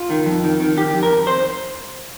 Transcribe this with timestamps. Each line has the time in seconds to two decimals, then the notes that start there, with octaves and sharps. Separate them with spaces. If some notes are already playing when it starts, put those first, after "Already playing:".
Already playing: F4
0.10 D#3
0.26 F2
0.44 D#3
0.60 D#3
0.77 D#3 G4
0.94 F2
1.03 A#4
1.10 F2
1.27 C5